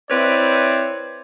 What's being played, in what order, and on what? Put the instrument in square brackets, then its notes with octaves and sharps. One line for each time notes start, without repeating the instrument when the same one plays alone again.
[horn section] C4 E4 B4 C#5 D5